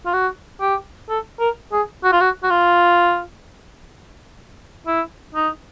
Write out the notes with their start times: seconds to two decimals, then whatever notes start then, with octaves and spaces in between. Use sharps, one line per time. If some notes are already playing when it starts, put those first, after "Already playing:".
0.06 F4
0.13 F#4
0.61 G4
1.09 A4
1.40 A#4
1.72 G#4
2.04 F#4
2.13 F4
2.21 F#4
2.43 F#4
2.50 F4
4.87 E4
5.35 D#4